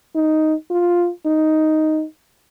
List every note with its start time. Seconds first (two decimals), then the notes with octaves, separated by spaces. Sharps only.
0.15 D#4
0.71 F4
1.26 D#4